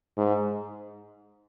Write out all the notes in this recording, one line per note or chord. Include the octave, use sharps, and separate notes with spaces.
G#2